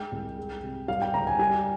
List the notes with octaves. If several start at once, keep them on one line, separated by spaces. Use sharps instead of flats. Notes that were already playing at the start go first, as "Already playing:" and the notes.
Already playing: G#3 G5
C2
G#3
C3
G3 F5
G5
C#2 A#5
G#5
G3 G#5